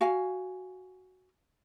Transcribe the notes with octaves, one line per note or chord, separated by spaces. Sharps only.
F#4 F5 G#5